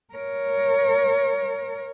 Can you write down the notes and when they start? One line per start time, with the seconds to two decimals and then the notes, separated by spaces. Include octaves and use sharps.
0.14 A#4 C#5